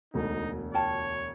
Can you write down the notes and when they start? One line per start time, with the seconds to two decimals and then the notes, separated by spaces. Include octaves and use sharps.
0.14 E1 D2 D#4
0.74 F4 C#5 G5 A5